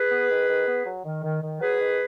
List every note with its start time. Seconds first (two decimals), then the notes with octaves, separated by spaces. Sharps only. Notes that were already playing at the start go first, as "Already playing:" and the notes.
Already playing: G#4 B4
0.11 B3
0.31 D#3
0.49 D#3
0.67 B3
0.86 F#3
1.05 D#3
1.24 D#3
1.43 D#3
1.61 F#3 G#4 B4
1.80 D#3